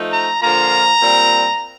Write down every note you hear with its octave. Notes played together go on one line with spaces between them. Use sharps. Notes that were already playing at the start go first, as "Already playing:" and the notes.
Already playing: F3 A3 D#4
A#5
D3 F3 A#3 F4 A#5
A#2 G3 C4